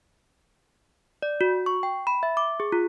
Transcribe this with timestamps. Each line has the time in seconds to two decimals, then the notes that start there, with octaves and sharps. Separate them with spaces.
1.22 D5
1.41 F#4
1.66 C#6
1.83 G5
2.07 B5
2.23 E5
2.37 D6
2.60 G#4
2.72 F4